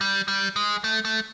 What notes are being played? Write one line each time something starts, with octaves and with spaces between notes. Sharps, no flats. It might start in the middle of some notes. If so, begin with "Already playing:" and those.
G3
G3
G#3
A3
A3